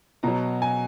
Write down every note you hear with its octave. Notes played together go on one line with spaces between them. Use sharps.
B2 F#3 A#5
G#5